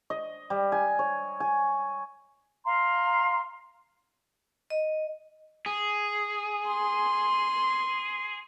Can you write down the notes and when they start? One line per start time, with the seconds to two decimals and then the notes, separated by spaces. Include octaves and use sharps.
0.10 D#5
0.50 G3
0.72 G#5
0.99 C#5
1.40 G#5
2.64 F5 A#5 C6
4.70 D#5
5.66 G#4
6.68 C6